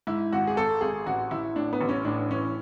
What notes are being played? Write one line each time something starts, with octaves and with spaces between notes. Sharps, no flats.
G#2 E4
G#1 F#4
G#4
G#1 A4
G#1 G#4
A1 F#4
A1 E4
A2 D4
B3
A1
C#4
A2 D4
E3 C#4